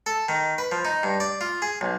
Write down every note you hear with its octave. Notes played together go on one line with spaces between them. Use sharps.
A4
D#3
B4
F3
D#4
G2
D5
F4
G#4
B1